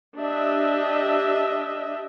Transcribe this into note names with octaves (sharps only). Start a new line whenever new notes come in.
D4 G4 D#5 E5